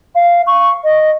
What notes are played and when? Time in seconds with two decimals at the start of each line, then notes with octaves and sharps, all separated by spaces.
0.15 F5
0.47 C#6
0.84 D#5